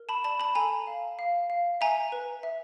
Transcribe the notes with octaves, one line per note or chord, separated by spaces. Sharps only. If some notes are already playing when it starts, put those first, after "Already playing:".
Already playing: A#4
A5 B5
D5 A5 B5
A5 B5
A4 G#5 A#5
F5
F5
F5
E5 G#5 A#5
B4
E5